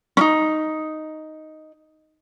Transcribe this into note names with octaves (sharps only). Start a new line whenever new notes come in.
C#4 D#4